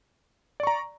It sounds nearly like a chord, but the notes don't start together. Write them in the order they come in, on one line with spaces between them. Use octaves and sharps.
D5 C#6 A#5